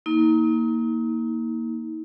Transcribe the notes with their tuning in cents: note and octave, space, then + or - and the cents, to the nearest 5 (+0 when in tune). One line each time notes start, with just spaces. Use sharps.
A#3 +0 D#4 +40